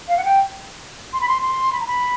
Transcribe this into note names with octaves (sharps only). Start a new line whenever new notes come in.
F5
F#5
G5
C6
B5
C6
C6
B5
A#5
B5